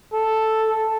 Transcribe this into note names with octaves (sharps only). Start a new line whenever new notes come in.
A4